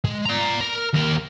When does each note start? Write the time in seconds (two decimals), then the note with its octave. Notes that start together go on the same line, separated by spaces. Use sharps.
0.05 G#3
0.25 D5 A#5
0.61 A#4
0.93 D#2 A#4